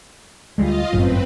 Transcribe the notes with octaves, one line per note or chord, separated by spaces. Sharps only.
D2 G3 G#3 F4 D#5 F5
G1 F#2 A2 C4 B4